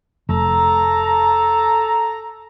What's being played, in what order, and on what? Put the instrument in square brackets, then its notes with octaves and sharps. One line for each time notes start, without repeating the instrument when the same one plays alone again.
[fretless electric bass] F1 [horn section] A4 A#5